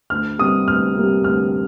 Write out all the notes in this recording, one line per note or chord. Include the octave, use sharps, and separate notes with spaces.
D2 F6
C3 G3 A#3 D#6
D2 F6
C3 G3 A#3
D2 F6